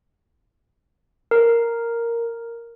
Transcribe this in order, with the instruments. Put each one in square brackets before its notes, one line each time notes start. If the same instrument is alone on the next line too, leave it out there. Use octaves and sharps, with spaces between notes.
[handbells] A#4